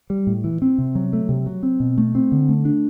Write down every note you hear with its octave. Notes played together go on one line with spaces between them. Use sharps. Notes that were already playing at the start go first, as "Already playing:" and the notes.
G3
A2
E3
C4
C3
F#3
A3
C3
F#3
C4
B2
A3
C4
D3
A3
D4